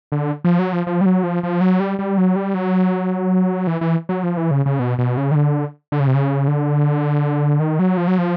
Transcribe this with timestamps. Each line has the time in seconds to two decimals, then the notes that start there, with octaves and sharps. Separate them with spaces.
0.12 D3
0.44 F3
0.59 F#3
0.73 F3
0.87 F3
1.01 G3
1.06 F#3
1.23 F3
1.43 F3
1.61 F#3
1.80 G3
1.99 G3
2.18 F#3
2.36 G3
2.54 F#3
3.67 E3
3.81 E3
4.09 F#3
4.23 F3
4.37 E3
4.51 C#3
4.66 C#3
4.79 B2
4.98 B2
5.17 C#3
5.31 D#3
5.35 D3
5.92 D3
6.00 C#3
6.07 C3
6.15 C#3
6.48 D3
7.60 D#3
7.79 F#3
7.97 F3
8.08 F#3
8.18 F3